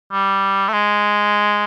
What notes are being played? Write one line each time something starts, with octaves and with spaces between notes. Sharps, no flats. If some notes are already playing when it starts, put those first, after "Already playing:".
G3
A3
G#3